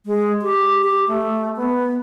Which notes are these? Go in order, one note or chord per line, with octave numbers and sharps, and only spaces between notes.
G#3
G4
G4
A3
B3